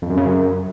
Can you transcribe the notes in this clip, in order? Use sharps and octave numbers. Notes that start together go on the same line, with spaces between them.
F2
F#2
C#3
F#2